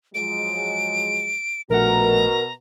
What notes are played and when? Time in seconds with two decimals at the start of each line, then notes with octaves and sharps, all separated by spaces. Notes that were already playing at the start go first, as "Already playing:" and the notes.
0.14 F3 F#3 G#3 D7
1.70 A#1 B2 A3 F#4 A#4 F#5 A#5